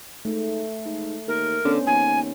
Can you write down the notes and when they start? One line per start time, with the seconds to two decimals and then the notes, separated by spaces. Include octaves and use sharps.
0.25 G#2 A3
0.85 G#2
1.27 D#2 A#4
1.65 D3 B3 C#4 C5
1.86 D#2 G#5